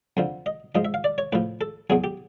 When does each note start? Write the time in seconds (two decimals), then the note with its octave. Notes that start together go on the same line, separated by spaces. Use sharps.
0.17 F2 D3 F3
0.46 D#5
0.75 G#2 F3 D#5
0.85 E5
0.94 F5
1.04 D5
1.18 C#5
1.32 A2 F3 B4
1.61 A4
1.90 E2 B2 F#3 G#4
2.04 G4